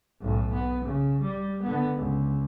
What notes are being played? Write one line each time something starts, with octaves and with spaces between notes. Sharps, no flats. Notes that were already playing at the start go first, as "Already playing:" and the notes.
B1 A2
B3
C#3
G3
D3 B3
C#2